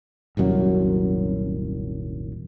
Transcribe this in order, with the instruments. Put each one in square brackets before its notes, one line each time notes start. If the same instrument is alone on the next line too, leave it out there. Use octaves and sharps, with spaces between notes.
[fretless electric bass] D#1 C2 F#2 F#3